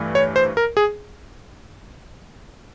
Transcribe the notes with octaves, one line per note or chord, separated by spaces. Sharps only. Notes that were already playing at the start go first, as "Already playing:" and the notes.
Already playing: G2 E3 A3
C#5
C5
A#4
G#4